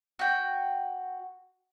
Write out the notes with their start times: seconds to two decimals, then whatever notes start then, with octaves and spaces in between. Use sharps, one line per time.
0.19 F#4 G5